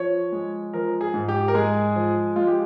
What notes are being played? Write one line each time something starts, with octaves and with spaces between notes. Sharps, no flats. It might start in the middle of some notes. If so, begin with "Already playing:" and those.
Already playing: F3 C#5
G#3
F3 A#4
G#4
G#2
G4
A#4
G#3 G#4
F3
G#3 F4
G4